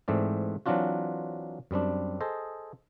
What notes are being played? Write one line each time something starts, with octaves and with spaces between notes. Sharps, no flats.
G#2 E3 A3 C4 D5
E3 F#3 C4 D4 F4 F#4
F#2 G3 C4 D4
G#4 A4 C5 D#5